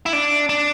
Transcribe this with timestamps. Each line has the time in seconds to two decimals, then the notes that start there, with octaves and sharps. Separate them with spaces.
0.06 E4
0.13 D4
0.49 D4